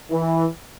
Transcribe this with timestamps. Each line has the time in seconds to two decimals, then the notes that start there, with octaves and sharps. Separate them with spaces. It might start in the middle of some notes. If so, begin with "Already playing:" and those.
0.10 E3